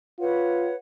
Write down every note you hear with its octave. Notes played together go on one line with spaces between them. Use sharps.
F4 B4 C#5 F#5